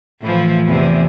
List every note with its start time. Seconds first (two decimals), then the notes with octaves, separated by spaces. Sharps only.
0.21 A2 E3 F3
0.66 E2 C3